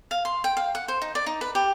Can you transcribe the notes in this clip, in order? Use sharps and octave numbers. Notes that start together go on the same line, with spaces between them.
F5
C6
G5
F5
F#5
C5
D#4
D5
D#4
B4
G4